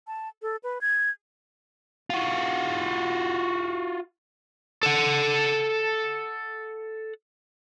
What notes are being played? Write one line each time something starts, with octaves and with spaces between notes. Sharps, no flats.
A5
A4
B4
G#6
F4 F#4
A4 F#5